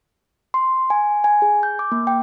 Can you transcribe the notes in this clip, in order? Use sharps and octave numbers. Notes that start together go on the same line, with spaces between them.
C6
G#5
G#5
G#4
G6
D6
A#3
G5